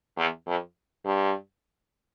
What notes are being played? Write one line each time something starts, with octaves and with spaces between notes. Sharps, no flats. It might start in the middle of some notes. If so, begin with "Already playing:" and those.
E2
F2
G2